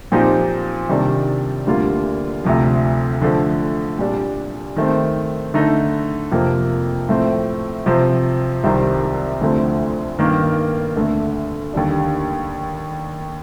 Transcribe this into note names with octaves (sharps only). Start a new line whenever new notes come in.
A#2 F3 C4 D#4 G4
C3 D#3 G3 D4
D2 D3 G3 A#3 F4
D2 C3 F3
D3 F3 A3
A#2 G3 D4 G4
D#3 A3 C4
D3 A3 D#4 A4
F2 C3 F3 A#3
A2 F3 A3 C4
C3 F3 C4
C2 C3 D#3 G3 C4
D2 D3 F3 A3 C4
G2 D#3 A#3
D2 D3 A3
D#2 D3 G3 D4